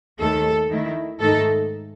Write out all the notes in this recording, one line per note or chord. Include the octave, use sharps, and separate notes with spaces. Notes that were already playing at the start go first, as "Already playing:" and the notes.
D#2 D#3 A3 A4
D#3 A3 E4
G#2 D#3 A3 D#4 A4